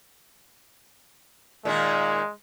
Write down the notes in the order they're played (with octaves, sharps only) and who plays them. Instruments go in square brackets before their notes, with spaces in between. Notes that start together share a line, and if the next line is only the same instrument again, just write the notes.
[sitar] A#2 D#3 A#3 [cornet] G#3